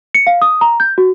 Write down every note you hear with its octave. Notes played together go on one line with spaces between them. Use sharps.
C#7
F5
D#6
A#5
G6
F#4